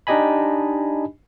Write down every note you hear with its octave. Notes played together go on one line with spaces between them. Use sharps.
D4 D#4 G4 D#5 G#5 B5